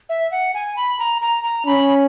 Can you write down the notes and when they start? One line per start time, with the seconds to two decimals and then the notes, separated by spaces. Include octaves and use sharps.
0.09 E5
0.31 F#5
0.54 G#5
0.76 B5
0.99 A#5
1.22 A#5
1.44 A#5
1.66 C#4 B5